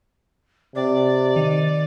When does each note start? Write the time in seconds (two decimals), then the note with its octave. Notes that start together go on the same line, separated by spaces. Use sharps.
0.75 C3 D5
1.36 D#3